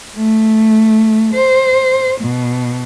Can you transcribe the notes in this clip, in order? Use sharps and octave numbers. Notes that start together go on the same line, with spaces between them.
A3
C5
B2